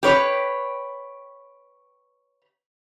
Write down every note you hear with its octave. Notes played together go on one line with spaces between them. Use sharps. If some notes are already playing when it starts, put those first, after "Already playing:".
G4 B4 C#5